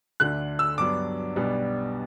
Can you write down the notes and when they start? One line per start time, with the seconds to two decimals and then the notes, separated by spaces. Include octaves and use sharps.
0.20 D2 D3 A3 D4 F#6
0.59 E6
0.78 G2 F#3 B3 D4 D6
1.36 B1 B2 G3 B3 D4